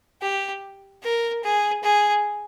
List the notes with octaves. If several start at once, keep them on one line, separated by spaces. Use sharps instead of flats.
G4
A#4
G#4
G#4